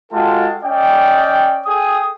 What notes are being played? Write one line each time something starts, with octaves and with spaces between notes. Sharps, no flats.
G#3 F4 F#4 A4 G5 A5
C#4 D5 D#5 G5
G#4 A4 G5 D#6